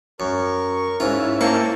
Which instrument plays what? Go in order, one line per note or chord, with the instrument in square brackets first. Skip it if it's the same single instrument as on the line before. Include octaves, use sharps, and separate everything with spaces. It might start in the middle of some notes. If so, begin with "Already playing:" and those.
[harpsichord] F#2 [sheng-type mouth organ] A#4 C#6
[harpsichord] G#2 F4 [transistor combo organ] C#4 E4
[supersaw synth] A#3 [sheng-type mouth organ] G5 A5 [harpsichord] C#6